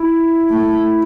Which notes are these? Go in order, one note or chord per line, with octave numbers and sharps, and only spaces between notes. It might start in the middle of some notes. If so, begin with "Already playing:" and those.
Already playing: E4
A3